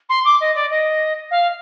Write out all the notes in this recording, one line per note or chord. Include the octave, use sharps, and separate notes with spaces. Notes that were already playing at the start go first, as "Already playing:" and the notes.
C6
D6
D#5
D5
D#5
F5